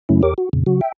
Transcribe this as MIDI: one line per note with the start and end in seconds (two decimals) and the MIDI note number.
0.09 0.22 42
0.09 0.22 49
0.09 0.22 54
0.09 0.22 57
0.09 0.22 61
0.09 0.22 64
0.23 0.34 40
0.23 0.34 67
0.23 0.34 70
0.23 0.34 73
0.23 0.34 86
0.38 0.49 66
0.53 0.63 41
0.53 0.63 46
0.53 0.63 49
0.66 0.81 49
0.66 0.81 54
0.66 0.81 66
0.81 0.92 76
0.81 0.92 79